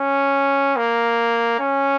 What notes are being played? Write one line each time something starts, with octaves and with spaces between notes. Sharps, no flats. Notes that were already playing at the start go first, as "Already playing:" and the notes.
Already playing: C#4
A#3
C#4